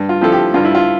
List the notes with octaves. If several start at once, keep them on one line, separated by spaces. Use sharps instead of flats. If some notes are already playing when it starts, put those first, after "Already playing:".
Already playing: G2
F4
F3 C4 E4 A4
G4
G2 F4
E4
F4